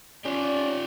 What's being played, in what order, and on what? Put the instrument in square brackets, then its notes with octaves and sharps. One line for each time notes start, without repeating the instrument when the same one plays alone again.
[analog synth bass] C#4 [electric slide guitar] F4 G4 [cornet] D5